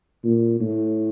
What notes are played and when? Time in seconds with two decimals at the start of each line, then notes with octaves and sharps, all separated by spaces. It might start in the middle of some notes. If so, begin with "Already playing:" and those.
0.24 A#2
0.61 A2